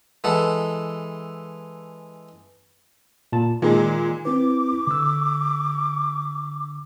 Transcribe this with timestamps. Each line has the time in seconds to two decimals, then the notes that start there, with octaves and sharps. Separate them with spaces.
0.24 E3 G#3 A4 F#5
3.32 A#2 A5
3.62 A#2 D#3 G#3
4.25 C4 E4 B4 D6
4.87 D3 E6